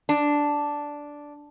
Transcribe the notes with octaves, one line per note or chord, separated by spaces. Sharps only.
D4